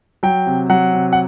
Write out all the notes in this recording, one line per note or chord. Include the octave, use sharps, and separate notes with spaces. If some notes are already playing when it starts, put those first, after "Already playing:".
F#3 G5
C3
F#3 F#5
C3
F#5